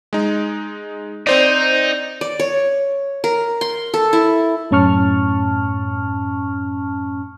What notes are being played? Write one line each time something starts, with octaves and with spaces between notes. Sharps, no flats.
G#3 D#4
C4 D#4 C5 D5
D5
C#5
A#4
C6
A4
E4
F#2 A2 C#4 A5 C#6 F6